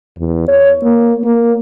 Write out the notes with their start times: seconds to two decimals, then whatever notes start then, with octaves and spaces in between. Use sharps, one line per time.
0.18 E2
0.48 C#5
0.83 A#3
1.24 A#3